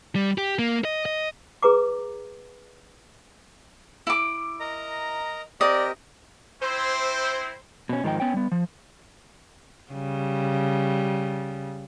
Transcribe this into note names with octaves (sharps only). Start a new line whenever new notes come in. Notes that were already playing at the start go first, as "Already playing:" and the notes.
G3
G4
A#3
D#5
D#5
G#4 B4 A#5 D6
E4 D6
A#4 D#5 A#5
C4 G4 A#4 D5 D#5
C4 E4 C5
B2 C#4
G#2 D#3 F3 D#4 G5
B3 C#4 G5
G3 B3
F3
C#3 G3